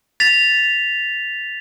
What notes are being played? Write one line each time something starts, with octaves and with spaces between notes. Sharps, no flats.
A6 B6 F7